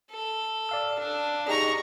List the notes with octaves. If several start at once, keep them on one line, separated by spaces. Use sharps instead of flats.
A4
D5 F5 E6
D4
D#4 G4 G#4 A#5 C#6